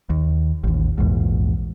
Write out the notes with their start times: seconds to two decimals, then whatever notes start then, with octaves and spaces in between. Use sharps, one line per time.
0.10 D#2
0.64 A1 D#2
0.98 A#1 E2 G#2